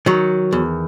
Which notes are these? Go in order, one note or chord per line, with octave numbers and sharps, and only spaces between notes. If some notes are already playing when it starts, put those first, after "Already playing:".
D#3 F#3
E2